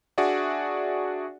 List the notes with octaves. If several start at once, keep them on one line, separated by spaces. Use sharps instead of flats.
D4 F#4 G#4 D5 E5 F#5